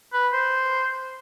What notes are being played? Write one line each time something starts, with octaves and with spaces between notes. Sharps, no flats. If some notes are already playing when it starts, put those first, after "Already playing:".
B4
C5